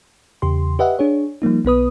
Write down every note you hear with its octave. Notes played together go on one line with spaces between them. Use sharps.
E2 C#3 G4 C6
G4 B4 D#5 E5 F#5
D4 G#4 C#5
F3 G3 A#3 D#4
B1 B3 B4 D#6